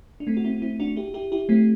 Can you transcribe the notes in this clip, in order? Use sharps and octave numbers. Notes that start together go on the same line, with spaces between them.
D4
A3 C4
F#4
C4 E4
C4 E4
D4 F#4
E4 G4
E4 G4
E4 G4
A3 C4